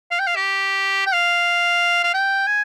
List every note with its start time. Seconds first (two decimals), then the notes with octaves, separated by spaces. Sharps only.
0.11 F5
0.19 G5
0.27 F5
0.36 G4
1.06 G5
1.13 F5
2.04 F5
2.14 G5
2.47 G#5